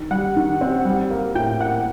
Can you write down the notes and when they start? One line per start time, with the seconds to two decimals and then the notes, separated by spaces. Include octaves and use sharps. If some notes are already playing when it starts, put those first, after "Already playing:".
Already playing: D#3
0.11 G3 F#5
0.36 D#3
0.61 C4
0.85 G3
1.10 A#3
1.35 A2 G5
1.60 A#3 F#5